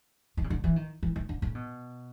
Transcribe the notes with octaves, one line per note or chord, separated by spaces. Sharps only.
D#3
C#3
D3
E3
D#3
E3
D#3
D3
C#3
B2